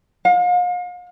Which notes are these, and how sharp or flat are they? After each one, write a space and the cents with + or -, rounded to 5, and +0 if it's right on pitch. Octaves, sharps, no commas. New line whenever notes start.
F5 +40